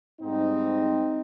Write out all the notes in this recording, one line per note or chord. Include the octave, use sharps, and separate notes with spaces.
G#2 G3 C4 D#4